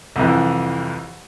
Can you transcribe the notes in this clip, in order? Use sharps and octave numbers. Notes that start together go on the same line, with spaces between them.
C2 F2 E3